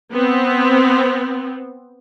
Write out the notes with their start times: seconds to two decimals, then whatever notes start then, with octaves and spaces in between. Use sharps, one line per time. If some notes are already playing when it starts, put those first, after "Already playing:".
0.11 B3 C4